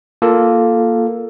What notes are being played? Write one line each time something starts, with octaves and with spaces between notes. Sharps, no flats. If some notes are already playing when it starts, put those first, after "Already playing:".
A#3 F4 A4